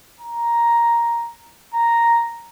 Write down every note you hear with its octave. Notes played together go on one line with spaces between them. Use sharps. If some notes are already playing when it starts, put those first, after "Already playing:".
A#5
A#5